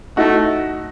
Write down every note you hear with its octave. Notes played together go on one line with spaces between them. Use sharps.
A3 D#4 F#4